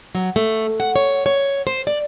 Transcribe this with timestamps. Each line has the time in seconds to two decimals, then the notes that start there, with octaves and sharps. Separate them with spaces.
0.15 F#3
0.36 A3
0.80 F#5
0.96 C#5
1.26 C#5
1.67 C5
1.87 D5